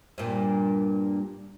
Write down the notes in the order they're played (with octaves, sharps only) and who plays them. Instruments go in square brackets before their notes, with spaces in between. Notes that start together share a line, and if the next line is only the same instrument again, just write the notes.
[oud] G2 A#2